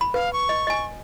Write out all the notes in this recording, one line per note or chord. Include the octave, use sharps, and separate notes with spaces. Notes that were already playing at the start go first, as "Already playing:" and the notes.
B5
B4 F5
C#6
D#5
D#5 G#5